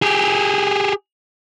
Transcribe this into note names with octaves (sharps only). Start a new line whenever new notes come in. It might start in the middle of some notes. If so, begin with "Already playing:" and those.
G4 G#4